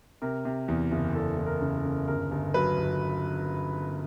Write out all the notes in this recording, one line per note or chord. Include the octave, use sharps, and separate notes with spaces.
C3 A#4
C3
E2
F#1
E2 A4
E2
A#4
C#3
A4
C#3
G1 A#4
G1
F#3 B4
G1